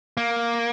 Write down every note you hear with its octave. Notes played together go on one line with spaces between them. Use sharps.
A#3